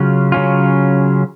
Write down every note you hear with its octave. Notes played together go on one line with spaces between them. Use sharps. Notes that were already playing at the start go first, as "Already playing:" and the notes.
Already playing: C#3 F#3 C#4 F4
C#3 F#3 C#4 F4